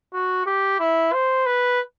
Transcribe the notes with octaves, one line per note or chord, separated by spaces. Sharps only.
F#4
G4
E4
C5
B4